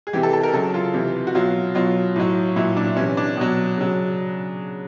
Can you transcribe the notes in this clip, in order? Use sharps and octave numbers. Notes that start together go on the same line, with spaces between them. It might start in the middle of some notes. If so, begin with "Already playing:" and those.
G#4
C3 E3 G4
A4
A4
A#4
C#3 F#3 A4
F4
C3 E3
F#4
B2 F#3 F4
B2 F#3 F4
A2 F#3
A#2 F#3 E4
D4
C3 E3 C#4
D4
B2 F#3
C#3 F#3